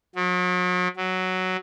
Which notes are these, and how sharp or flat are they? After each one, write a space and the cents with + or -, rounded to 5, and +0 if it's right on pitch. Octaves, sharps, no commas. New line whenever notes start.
F#3 -40
F#3 +5